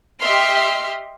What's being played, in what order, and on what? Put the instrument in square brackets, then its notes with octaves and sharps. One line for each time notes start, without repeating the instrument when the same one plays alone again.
[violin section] G4 D#5 E5 C6 F6